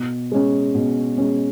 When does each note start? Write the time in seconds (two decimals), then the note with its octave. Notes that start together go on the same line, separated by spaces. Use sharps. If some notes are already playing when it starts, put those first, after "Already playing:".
Already playing: B2
0.32 G#3 C#4
0.75 B2
1.18 G#3 C#4